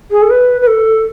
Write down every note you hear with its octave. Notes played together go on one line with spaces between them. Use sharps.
G#4
A4
B4
B4
A4